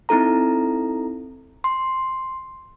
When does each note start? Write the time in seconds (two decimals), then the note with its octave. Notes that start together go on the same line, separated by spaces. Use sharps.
0.09 C4 D#4 E4 A4 A#5
1.64 C6